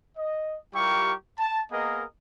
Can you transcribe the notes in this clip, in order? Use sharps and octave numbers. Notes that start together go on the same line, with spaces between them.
D#5
G3 E4 F4 G4 A#4 C#6
A5
A#3 B3 G#4 A#4 D#5